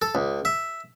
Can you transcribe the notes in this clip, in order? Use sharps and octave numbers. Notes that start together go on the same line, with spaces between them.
A4
C#2
E5